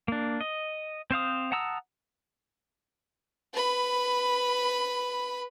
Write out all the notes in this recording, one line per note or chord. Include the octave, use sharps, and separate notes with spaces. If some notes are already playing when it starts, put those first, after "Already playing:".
A#3 D4
D#5
C4 C5 F5 D#6
F#5 A5 A#5 D#6 E6
B4 B5